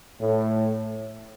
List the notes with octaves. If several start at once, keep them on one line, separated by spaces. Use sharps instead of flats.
A2